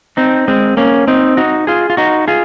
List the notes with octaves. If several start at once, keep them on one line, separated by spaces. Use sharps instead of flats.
C4 D#4
G#3 C4
A#3 C#4
C4 D#4
D#4 F#4
F4 G#4
F4
D#4 F#4
F4 G#4